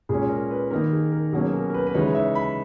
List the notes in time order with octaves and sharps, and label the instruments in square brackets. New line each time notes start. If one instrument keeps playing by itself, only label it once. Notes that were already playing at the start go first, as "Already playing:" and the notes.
[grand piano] A#2 G#3 C#4 G#4
A#4
B4
D#3 A#3 D#4 A#4
G#4
A#4
B2 F#3 A#3 C#4 G#4
A#4
A#4
B4
B4
C#3 E3 G#3 D#4 C#5
E5
B5